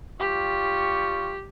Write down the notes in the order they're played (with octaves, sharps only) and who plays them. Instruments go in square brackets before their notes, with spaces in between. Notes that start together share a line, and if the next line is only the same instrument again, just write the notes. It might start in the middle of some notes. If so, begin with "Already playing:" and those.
[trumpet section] G3 F4 C#6 [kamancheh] G4